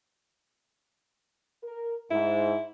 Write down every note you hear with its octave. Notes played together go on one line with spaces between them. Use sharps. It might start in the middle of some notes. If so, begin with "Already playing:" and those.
A#4
G#2 E4